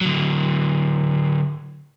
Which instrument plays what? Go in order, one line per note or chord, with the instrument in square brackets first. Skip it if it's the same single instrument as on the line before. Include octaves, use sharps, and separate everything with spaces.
[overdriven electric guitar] D3 F#3